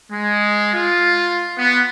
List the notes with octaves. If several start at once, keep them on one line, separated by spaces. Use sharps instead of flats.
G#3
F4
B3